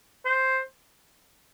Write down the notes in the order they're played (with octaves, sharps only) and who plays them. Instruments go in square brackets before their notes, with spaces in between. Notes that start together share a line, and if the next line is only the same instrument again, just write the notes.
[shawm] C5